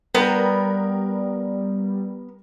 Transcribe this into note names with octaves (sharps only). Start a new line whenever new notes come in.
G3 B3 A#4 G5 B5